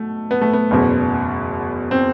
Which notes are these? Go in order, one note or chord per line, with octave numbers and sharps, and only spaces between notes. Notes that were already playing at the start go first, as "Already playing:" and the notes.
Already playing: B2 A3
B3
A3
B3
F#1 E2 B2
C4